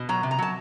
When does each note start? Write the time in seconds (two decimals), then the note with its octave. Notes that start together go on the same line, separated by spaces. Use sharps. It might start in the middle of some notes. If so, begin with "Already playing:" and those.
Already playing: B2
0.09 F#3 A#5
0.23 C3
0.31 A#5
0.39 F#3 A5